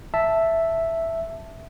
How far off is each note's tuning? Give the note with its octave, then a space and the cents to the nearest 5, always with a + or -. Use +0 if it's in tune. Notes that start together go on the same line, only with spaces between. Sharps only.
E5 +0 A5 +0